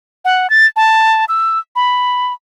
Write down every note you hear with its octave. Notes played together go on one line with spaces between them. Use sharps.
F#5
A6
A5
E6
B5